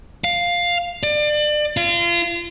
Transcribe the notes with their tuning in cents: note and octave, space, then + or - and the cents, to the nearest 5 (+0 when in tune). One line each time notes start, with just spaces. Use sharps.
F5 +5
D5 +30
F4 -30